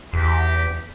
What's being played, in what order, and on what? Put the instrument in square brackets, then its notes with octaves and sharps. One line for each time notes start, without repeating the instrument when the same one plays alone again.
[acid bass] E2 [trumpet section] D#4 G4 B5